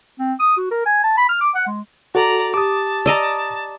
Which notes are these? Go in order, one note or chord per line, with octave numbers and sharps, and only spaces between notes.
C4
D#6
F#4
A#4
G#5
A5
B5
F6
D6
F#5
G#3
F#4 A4 D5 A#5
G4 A5 D6 D#6
D5 D#5 A#5 E6